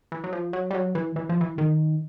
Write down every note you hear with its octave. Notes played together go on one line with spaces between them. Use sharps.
E3
F#3
F3
F#3
G3
F#3
E3
E3
F3
E3
D#3